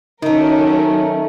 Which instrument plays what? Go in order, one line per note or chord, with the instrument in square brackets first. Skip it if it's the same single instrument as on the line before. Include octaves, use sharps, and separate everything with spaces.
[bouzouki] D#3 A3 [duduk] F#3 [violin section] C#4 A#4 [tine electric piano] D#4